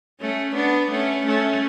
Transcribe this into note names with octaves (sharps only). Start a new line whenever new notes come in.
A3 C#4
B3 D4
A3 C#4
A3 C#4